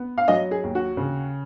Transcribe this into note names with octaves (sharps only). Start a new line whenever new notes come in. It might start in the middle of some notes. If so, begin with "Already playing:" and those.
Already playing: B3
F5
F#3 D#5
G#4
D#2
F#4
C#3